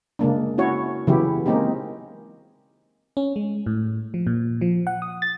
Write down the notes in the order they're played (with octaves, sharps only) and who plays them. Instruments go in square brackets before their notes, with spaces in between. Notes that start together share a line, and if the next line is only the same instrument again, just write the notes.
[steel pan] C#3 G#3 A#3 D4
C#4 E4 F#4 C#5
C#3 E3 F#3 B3 E4 G4
G#3 A#3 C4 C#4 D#4 G4
[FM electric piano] C#4
G#3
A2
F3
A#2
F3
F#5
D#6
A6